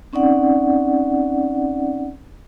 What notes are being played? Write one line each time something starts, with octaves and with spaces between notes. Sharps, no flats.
C4 C#4 D#4 D5 F#5